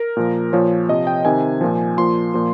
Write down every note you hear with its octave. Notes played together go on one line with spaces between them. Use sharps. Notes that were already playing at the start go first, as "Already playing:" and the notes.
Already playing: A#4
A#2 F3
A#2 F3 C#5
C3 F3 D#5
G5
C3 D#3 G#5
A#2 F3
A#2 F3 C6
A#2 F3